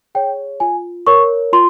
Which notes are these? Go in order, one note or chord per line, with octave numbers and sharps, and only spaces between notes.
G#4 C#5 G5
F4 G#5
A#4 C#5 C#6
F4 C6